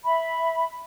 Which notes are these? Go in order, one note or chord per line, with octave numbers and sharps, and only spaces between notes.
E5 B5